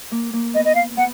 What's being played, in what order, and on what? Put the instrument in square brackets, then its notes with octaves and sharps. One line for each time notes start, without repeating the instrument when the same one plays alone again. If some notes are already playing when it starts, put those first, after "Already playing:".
[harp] A#3
A#3
[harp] B3 [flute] D#5
[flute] D#5
F5
[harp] B3 [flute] F#5